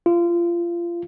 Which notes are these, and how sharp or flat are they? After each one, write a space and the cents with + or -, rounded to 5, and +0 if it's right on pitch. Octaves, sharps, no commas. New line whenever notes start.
F4 -25